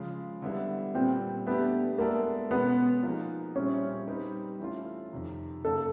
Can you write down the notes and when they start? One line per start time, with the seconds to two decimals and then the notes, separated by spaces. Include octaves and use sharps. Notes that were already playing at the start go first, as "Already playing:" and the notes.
Already playing: C#3 F3 G#3
0.42 D3 G3 B3 E4
0.94 A#2 G3 B3 C4
1.46 A3 B3 D4 G4
1.98 G#3 A#3 B3 E4 A4 D5
2.51 B2 G#3 B3 C#4
3.03 F3 A#3 D#4 G#4
3.55 A#2 G3 C4 C#4 E4 G#4
4.07 G3 C4 D#4 G4 B4
4.60 E3 A3 C#4 F4
5.12 F2 C3 D#3
5.64 F#2 C#3 F#3 A#3 A4